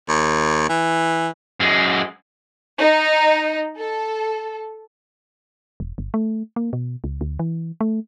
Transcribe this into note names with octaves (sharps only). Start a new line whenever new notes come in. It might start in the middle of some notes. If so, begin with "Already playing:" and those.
D#2
E3
F#2 G#3
D#4
A4
E1
G1
A3
A#3
B2
C#2
D2
E3
A3